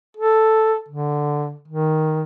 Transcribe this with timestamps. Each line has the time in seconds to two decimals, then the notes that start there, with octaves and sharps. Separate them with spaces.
0.17 A4
0.88 D3
1.68 D#3